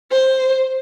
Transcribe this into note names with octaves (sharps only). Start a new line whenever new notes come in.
C5